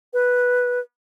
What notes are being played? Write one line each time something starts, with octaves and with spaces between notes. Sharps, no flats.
B4